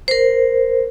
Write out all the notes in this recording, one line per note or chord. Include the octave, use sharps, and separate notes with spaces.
A#4 C5